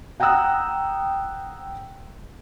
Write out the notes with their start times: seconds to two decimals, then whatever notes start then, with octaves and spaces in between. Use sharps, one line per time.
0.20 F#5 G5 A#5 D#6 E6 F#6